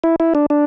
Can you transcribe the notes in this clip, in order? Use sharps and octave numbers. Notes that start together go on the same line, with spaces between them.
E4
E4
D4
D4